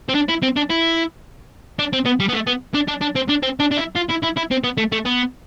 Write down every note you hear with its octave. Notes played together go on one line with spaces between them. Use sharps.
C4
D4
E4
C4
D4
E4
D4
C4
B3
G3
B3
A3
B3
D4
D4
D4
C4
D4
C4
D4
D4
E4
F4
E4
E4
E4
C4
B3
A3
A3
B3